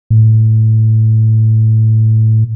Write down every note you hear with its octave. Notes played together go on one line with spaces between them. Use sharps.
A2